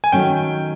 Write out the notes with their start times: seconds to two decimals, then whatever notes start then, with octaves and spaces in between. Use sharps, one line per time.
0.04 G#5
0.12 D#3 F#3 A3 C#4 G5